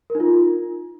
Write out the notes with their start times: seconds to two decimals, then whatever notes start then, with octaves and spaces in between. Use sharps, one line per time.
0.10 A#4
0.15 D#4
0.20 F4